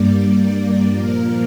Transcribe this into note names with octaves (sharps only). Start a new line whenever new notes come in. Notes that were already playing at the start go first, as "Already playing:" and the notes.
Already playing: G2 G3 A#3 D5
A#2 F3 A#3 A#4